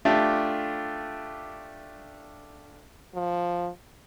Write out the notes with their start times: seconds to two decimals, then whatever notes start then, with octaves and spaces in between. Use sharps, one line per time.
0.05 A3 D4 F4 G4 E5
3.15 F3